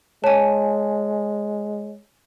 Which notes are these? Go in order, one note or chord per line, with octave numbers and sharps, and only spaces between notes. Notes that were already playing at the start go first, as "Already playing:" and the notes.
G#3 C#5 G#5 A5